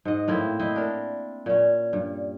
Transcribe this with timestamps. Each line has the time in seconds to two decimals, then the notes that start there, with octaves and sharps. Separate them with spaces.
0.05 G#2 D#5
0.28 A2 A#3 C4 E4
0.59 E4 C5 D#5
0.76 D4 A#4
1.46 A#2 C#4
1.93 G2